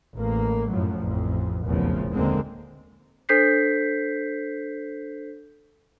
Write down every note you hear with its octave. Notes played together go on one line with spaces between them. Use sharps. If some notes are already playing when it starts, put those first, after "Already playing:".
A1 A#3
F#2 A2 F3 F#3
A1 F2
F1 B1 E2 A#2 C#3 F3
D#2 D3 G#3 A#3 C4
D4 A4 C5 G6 B6 C7